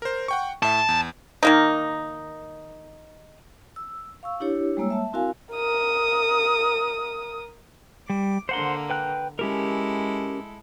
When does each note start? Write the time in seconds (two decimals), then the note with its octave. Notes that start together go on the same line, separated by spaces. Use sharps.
0.02 A#4 C5
0.28 F#5 G5 C#6
0.63 A2 E5 A5
0.88 E2
1.43 D#3 A#3 D#4
3.76 E6
4.23 F5 C#6 E6
4.40 D4 E4 G4 C#5
4.77 G3 G#3 A#3 C#5 E6
4.90 E5 A5
5.13 C4 E4 F#4 A#4 F5 G#5
5.53 A#4 D#6
8.10 G3 D6
8.49 D3 A#3 C5 F#5 C6
8.90 B4 G5 F#6
9.39 G#3 C#4 E4 G4 A4 A#4